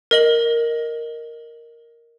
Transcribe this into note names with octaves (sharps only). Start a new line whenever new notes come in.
A#4 D#5 F#7